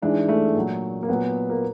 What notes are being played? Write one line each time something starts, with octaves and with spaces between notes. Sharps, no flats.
G#2 E3 G#3 D4
A3
A#2 F#3
A#3
A#2 F#3 B3
A#3